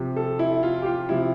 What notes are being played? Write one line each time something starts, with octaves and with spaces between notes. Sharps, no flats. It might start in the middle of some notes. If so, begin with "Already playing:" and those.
Already playing: C3 F3
A4
E4
F4
G4
F4
C3 F3 E4